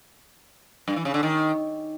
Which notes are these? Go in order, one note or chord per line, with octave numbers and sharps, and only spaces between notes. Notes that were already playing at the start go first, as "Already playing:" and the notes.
G2
E3
C#3
D3
D#3